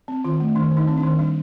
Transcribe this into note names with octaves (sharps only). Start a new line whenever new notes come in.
C4
D#3 F4
A3
D#3 D4
D#3
D#4
C4
D4
D#3
G3 D4